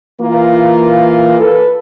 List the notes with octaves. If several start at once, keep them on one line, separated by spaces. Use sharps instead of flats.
E3 A#3 F4 A#4
A4 B4